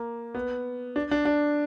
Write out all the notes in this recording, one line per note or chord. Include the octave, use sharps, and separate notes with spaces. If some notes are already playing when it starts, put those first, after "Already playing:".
Already playing: A#3
B3
D4
D4
D4